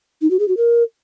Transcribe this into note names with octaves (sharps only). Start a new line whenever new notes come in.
D#4
F#4
G#4
F#4
A#4